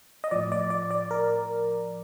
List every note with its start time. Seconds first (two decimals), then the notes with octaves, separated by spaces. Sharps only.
0.24 D#5
0.31 A2 F3 D5
0.52 D5
0.70 D5
0.91 D5
1.11 A#4